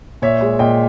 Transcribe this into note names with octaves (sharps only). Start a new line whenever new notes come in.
A#2 C#5 E5
G#3
A#2 D#5 G5